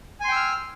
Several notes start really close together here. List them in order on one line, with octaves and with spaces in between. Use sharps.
G#5 C6 G5 E6 F6